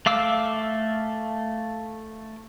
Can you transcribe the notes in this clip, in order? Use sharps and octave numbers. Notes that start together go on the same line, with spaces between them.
A3 F5 D6 E6